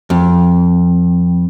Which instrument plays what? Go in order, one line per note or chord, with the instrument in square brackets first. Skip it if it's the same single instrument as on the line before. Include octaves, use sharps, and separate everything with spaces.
[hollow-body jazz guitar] F2